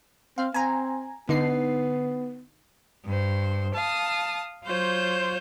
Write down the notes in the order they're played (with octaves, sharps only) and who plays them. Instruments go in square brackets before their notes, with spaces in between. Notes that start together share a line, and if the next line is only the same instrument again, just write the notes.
[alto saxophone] C4 [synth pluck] F5
[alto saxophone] C4 [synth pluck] G#5 A#5
[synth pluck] D3 D#4 C7 [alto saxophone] B3
[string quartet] G2 C5
F5 A5 D#6
F#3 F4 C5 C#5 G6